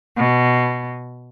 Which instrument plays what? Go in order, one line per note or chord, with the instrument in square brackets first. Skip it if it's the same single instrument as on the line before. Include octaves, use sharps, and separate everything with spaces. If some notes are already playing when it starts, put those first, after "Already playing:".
[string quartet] B2